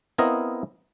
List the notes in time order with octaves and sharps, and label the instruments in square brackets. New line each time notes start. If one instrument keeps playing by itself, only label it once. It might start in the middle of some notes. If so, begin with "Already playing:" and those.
[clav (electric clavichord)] B3 C4 E4 A#4 D#5 F5